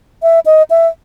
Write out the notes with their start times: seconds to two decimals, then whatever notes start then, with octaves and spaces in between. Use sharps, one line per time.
0.23 E5
0.46 D#5
0.70 E5